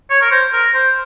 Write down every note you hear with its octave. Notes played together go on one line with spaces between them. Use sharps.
C#5
A#4
C5
A#4
C5